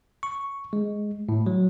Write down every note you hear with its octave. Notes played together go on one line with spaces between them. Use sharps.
C#6
G#3
A2
F#3